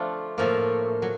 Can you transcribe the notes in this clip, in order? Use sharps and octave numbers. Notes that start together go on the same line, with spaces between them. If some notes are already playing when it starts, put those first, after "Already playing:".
Already playing: F3 A3 D4 F4
A2 F3 A#3
F#3